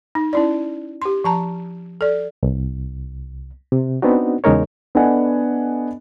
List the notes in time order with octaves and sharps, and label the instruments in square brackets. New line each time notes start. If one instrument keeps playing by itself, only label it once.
[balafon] D#4
C#4 E4 D5
G4 C6
F3 A5 A#5
A4 D5
[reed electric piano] C2
C3
B3 C4 D4 D#4 F#4
E2 C#3 G#3 D#4 A#4 C#5
[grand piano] B3 D4 A4 D#5 F#5 G#5